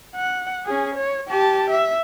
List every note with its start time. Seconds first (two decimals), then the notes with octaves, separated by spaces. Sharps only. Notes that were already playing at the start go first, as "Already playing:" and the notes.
0.15 F#5
0.66 C#4 G#4
0.95 C#5
1.28 G4 A5
1.70 E5